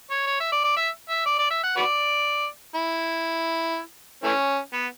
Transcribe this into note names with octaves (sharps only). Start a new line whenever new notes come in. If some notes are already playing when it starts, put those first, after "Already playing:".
C#5
C#5
E5
D5
D5
E5
E5
D5
D5
E5
F#5
F#4 B4 D5
E4
E3 A3 C#4
B3